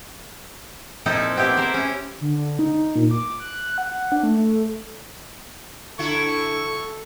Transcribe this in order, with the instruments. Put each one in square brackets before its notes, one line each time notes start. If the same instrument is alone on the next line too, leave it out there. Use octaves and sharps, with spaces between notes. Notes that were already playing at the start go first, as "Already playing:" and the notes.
[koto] A#2 F3 C4 D#4 E4 A4
B3 C4 E4 G4
E4 G4 A#4 C5
C#4 E4
[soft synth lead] D3
D#4
A#2
D6
F#6
F#5
D4
A3
[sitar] D3 E4 F#4 [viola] A4 [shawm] C#6